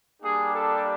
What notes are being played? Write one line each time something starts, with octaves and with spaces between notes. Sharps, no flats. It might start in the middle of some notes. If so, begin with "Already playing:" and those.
G3 A#3 D4 G4 G#4
A4